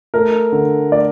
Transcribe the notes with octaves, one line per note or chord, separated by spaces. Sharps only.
A3 A#4
D3
A3 D5